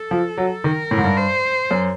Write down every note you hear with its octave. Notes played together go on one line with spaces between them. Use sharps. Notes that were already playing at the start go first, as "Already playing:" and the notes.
Already playing: A4
F3
F#3
D#3 A#4
A2
G#2
G2
C5
F#2